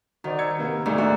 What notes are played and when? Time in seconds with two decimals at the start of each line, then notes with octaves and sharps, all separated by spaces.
0.24 D#3 F#4 C5 D5
0.39 E6 G#6 C#7
0.59 C3 A#3 B3
0.85 D2 G#2 D#3 D4
0.98 A#1 F#4 D5 E6